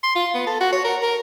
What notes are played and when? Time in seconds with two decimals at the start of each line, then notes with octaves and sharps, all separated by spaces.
0.03 C6
0.16 F4
0.35 B3
0.47 A4
0.61 F#4
0.72 C#5
0.84 A#4
1.03 A#4